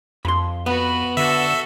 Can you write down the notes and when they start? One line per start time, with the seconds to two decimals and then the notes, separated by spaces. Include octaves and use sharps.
0.25 F2 B5 C6
0.66 B3 F#4 B4
1.17 D3 F#4 A4 E5